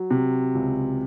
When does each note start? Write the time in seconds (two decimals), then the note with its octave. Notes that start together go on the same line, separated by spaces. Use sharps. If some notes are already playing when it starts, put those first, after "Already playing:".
Already playing: F#3
0.11 C3
0.55 C#2